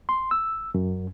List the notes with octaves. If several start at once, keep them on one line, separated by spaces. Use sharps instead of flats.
C6
E6
F#2